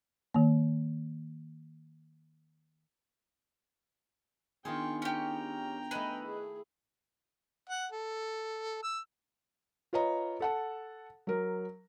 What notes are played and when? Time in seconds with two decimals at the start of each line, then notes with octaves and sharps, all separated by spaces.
0.34 D#3 A#3
4.65 D#3 B3 D4 F4 G#4 G5 C#6
5.02 C#4 G4 G5 A#5
5.91 A3 B4 D#5 G#5
6.23 E4 G#4
7.69 F#5
7.92 A4
8.83 E6
9.93 F4 B4 C#5 D#5 A#5
10.40 A4 F#5 A5
11.27 F#3 A#4